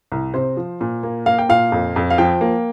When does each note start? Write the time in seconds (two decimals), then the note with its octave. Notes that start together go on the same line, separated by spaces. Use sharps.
0.12 C2
0.34 C3 C5
0.57 F3
0.81 A#2
1.03 A#3
1.26 A#3 F5
1.38 G5
1.49 A#2 F5
1.72 F2
1.96 F2
2.10 F5
2.18 F3 G5
2.41 A#3